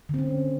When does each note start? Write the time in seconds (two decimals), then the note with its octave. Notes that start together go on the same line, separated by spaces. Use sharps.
0.09 D3
0.14 C4
0.19 C#4